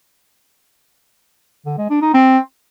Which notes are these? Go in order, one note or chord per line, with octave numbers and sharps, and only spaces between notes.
D3
G#3
D4
D#4
C4